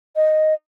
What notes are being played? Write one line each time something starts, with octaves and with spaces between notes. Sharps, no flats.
D#5